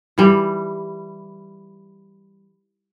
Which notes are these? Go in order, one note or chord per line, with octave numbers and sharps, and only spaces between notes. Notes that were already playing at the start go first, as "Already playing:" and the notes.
E3 G3